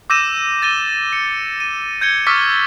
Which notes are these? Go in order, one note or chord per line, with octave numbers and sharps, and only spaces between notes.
D6 E6 G6 A#6 D#7 E7
A6 D#7 G7
C#7
D#7
G6 G#6 C#7 G7
C#6 D6 E6 F6 A6 B6